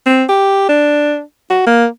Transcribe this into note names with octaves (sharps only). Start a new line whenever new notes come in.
C4
G4
D4
F#4
A#3